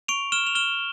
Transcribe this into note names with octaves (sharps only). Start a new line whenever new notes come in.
C#6 D7 F7
F6 E7 G7
F7
F6 E7 G7